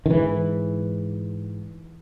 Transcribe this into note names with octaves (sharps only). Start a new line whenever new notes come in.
D#3
G#2 E3